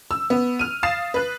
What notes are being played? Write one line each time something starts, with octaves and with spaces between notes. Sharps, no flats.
E6
B3
F6 D#7
F5 D#6 A6 C7 E7
B4 F#6